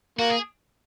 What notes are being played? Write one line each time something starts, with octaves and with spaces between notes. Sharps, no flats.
A#3 F#4
G#4